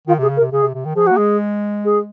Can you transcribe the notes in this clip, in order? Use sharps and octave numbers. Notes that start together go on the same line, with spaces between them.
D#3 F4
C3 G#4
C#3
A#4
C3
C#3 G#4
C3
C3
D#3
F3 G#4
A#3 F#4
G#3 G#4
G#4